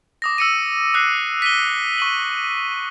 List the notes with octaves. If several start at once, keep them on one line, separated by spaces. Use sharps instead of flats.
D6 D#6 A#6
E6 C#7 D#7
D#6 F#6 C7
B6 D#7 G7
C#6 D#7 F#7